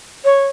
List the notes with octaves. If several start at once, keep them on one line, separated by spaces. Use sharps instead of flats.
C#5